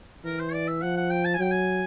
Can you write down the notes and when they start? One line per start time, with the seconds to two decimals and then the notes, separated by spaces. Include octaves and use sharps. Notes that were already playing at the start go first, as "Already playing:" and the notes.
0.25 E3 A#4
0.39 C5
0.53 D5
0.68 E5
0.82 F3 F#5
0.97 F#5
1.10 G5
1.25 A5
1.34 G#5
1.39 F#3 G5
1.51 G#5